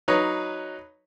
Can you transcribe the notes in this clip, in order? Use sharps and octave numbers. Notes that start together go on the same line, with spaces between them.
F#3 D#4 B4 C#5